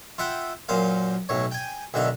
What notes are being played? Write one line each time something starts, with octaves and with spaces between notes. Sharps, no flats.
F4 E5 F#5 G5 B5
F#2 A#2 C5 F5
B1 A2 C#5
G5 G#5
B1 D3 D#3 E5